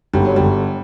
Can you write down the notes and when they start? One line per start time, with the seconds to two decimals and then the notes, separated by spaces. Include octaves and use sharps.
0.13 G1 G3
0.25 F#3
0.36 G1 G3